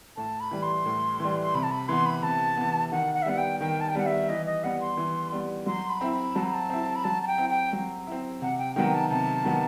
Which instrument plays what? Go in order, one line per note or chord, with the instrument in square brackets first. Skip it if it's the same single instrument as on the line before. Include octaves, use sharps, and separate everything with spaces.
[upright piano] A2 [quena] A5
[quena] B5
[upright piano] E3 G3
[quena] C6
[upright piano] A2
E3 G3
[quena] C6
[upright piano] C3 [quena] B5
[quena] A5
B5
[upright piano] E3 B3 [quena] C6
[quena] B5
[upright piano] C3 [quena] A5
[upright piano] E3 B3
[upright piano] D#3 [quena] F#5
[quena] F#5
E5
[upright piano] G3 B3 [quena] F#5
[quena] G5
[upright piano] D#3 [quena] G5
[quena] A5
G5
[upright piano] G3 B3 [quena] F#5
[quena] E5
[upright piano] E3 [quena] D#5
[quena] D#5
[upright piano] G3 B3 [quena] F#5
[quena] C6
[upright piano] E3
G3 B3
[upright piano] F#3 [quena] C6
[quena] B5
[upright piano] C4 E4
[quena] B5
[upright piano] F#3 [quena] A5
[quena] B5
A5
[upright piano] C4 E4
[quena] B5
[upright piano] F#3 [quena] A5
[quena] A5
G5
[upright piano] C4 E4
[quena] G5
[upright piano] F#3
C4 E4
[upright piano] C3 [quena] F#5
[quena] G5
[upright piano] D#3 F#3 B3 [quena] G5
[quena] A5
[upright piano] C3 [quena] A5
[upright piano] D#3 F#3 B3